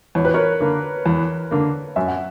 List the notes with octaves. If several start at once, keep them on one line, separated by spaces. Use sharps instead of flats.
E2 C#5
B4
A#4 C#5
D3 A#3
E2
D3 A#3
F#2 E5
F#5